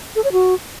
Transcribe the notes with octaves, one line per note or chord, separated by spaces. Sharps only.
A4
C#5
F#4